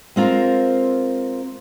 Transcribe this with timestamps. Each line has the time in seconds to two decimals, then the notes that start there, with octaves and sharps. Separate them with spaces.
0.16 G#3 C4 F4 A#4 C5